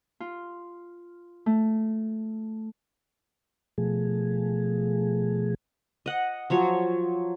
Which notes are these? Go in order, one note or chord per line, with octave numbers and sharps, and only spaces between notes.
F4
A3
B2 F3 A3 G#4
D#5 F#5
F3 F#3 C#5